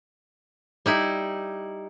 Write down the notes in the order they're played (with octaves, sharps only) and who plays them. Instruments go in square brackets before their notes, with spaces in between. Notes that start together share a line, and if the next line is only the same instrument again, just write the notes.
[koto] G3 D#4 E4